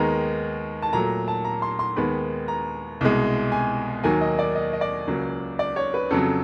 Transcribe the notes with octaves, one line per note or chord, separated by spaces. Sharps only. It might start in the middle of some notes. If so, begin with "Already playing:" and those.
Already playing: D#2 D#3 G#3 B3 A#5
A5
A#2 F#3 A3 A#5
A5
A#5
C6
C6
D#2 D#3 G#3 B3 B5
A#5
C2 B2 G#3
G#5
D#2 D#3 F#3 A#3 G#5
D#5
D5
D#5
D#5
D5
C#2 C#3 F#3 A#3
D5
C#5
B4
F2 C#3 F#3 A4